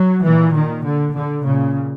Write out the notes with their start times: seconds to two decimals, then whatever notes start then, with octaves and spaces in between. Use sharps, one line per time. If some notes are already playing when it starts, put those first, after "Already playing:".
Already playing: F#3
0.23 A#2 E3
0.53 D#3
0.83 D3
1.14 D3
1.44 A#2 C#3